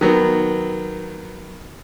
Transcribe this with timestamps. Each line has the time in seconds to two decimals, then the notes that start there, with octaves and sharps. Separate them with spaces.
0.01 D#3 F#3 B3